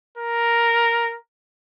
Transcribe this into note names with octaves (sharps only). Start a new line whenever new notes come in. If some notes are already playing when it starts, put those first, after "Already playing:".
A#4